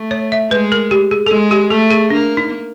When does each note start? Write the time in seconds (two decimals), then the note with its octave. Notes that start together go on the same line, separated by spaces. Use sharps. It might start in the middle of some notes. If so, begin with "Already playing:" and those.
Already playing: A3
0.11 C#5
0.32 E5
0.51 G#3 B4
0.72 A#4
0.91 G4
1.11 G#4
1.26 A4
1.31 G#3 G#4
1.51 G4
1.70 A3 A4
1.91 G#4
2.10 A#3 D4
2.37 D#4